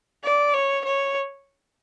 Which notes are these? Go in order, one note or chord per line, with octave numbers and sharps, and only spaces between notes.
D5
C#5
C#5